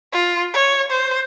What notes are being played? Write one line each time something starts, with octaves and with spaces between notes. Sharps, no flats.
F4
C#5
C5